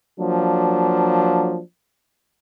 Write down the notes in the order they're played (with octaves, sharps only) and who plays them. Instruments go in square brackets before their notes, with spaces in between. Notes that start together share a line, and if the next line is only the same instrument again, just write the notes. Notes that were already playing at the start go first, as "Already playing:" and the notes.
[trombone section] F3 F#3 A#3 D4